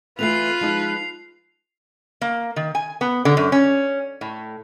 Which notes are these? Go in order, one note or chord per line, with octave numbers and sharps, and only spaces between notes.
E3 A3 C4 F4 B4 C7 F7
F3 G#3 D#4
A#3
D#3
G#5
B3
D3
F#2
C#4
A2